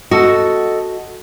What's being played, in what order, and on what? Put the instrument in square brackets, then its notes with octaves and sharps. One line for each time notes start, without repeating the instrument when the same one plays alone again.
[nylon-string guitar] F#4 [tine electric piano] A4 D#5